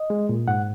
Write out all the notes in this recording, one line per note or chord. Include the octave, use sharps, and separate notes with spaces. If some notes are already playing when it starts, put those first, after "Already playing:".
Already playing: D#5
G#3
A#2
G#2 F#5